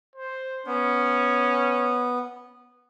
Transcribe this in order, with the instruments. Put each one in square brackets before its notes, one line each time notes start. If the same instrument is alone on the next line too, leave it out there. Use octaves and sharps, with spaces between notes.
[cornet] C5
[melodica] B3 [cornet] C#4